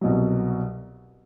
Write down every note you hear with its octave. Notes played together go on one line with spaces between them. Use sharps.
C2 B2 F#3